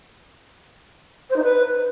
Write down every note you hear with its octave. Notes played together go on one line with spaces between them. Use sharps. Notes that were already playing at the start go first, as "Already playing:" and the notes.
C5
D#4
B4